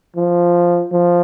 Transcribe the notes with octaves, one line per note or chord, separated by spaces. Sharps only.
F3
F3